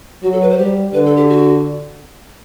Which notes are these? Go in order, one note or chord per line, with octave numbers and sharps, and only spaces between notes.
F#3 F#4
A4
B4
C5
G3 G4
D3 B4
A4
G4
F#4